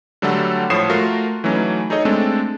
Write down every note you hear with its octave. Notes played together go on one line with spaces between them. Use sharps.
D3 F#3 G3 A3 A4 F#5
A2 F3 C#5 D#6 C7 E7
A3 F4 F#4 A#4
E3 F#3 A3 C#4 D#4
D#4 G#4 A4 C#5 D#5
G#3 A3 C4 D4 A4